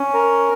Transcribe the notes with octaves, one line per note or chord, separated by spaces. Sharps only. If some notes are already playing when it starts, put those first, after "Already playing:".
Already playing: C#4
A#4